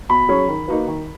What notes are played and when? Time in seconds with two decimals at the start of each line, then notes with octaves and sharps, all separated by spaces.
0.09 B2 B5
0.28 F#3 C#4 G#4 C#5
0.48 D#3
0.68 A#3 D#4 F#4 B4
0.87 D#3